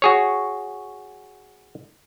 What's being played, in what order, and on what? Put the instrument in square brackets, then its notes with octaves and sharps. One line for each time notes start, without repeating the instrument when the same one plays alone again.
[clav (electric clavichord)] F#4 G#4 C#5